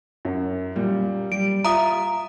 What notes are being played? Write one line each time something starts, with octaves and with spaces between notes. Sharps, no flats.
F#2
A#2 G3
G3 D7
F4 E5 A#5 D#6